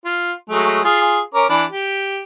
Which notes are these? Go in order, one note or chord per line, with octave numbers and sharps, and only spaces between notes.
F4
F#3 G#3 A3
F4 G#4
C#4 A#4 D6
E3 D4 B5
G4